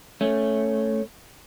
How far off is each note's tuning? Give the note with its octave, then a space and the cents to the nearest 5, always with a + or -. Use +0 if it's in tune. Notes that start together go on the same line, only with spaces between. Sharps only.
A3 +0 C#4 +0